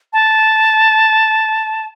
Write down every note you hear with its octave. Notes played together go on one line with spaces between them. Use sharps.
A5